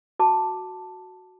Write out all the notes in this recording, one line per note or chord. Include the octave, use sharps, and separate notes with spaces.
F#4 A5 D6